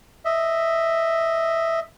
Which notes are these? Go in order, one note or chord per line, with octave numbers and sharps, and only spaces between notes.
D#5 E5